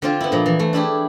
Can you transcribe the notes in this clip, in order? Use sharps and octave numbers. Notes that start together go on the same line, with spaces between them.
D3 C4 F4
B3 E4
A#2 F3
E3
A3
D4 E4 G4 G#4